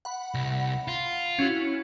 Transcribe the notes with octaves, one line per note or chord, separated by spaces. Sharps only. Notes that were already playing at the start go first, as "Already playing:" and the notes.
F#5 B5
C2
F4
C#4 E4 F#4